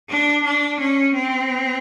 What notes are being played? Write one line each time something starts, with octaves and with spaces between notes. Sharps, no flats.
D4
D4
C#4
C4